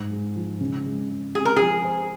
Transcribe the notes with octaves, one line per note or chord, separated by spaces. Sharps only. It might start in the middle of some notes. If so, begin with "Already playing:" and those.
Already playing: G#2
G#3
F3
C#3
G#3
G#3
C4 G#4
A#4
F3 G#4
C5